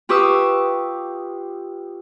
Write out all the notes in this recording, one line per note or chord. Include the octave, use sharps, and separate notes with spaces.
F4 G4 B4 C#6 D#6 E6